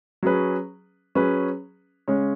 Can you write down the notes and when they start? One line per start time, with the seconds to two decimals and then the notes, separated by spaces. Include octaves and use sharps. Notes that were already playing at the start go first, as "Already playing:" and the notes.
0.23 F#3 C#4 G#4 B4
1.15 F#3 C#4 G#4 B4
2.08 C#3 G#3 C#4 G#4 C#5